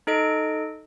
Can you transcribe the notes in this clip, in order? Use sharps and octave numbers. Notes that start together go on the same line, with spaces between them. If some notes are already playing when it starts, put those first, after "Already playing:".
D#4 A4 D#5 D7